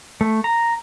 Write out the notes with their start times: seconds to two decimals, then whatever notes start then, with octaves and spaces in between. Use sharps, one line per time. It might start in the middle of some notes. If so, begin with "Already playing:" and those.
0.21 A3
0.44 A#5